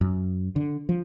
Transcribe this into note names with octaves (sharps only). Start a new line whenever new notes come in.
F#2
D3
F3